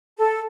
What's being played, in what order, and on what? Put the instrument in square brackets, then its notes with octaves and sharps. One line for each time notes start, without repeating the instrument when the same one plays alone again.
[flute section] A4